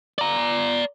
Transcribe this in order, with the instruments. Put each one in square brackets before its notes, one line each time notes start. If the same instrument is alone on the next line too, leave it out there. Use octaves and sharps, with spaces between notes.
[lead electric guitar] D5 A#5